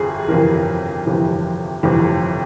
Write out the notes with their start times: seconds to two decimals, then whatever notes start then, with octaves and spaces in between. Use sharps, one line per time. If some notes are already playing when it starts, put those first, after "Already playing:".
Already playing: G1 F2 C3 G#4
0.28 G1 F2 C3 E3 A#4
1.06 G1 F2 C3 E3
1.83 G1 F2 C3 E3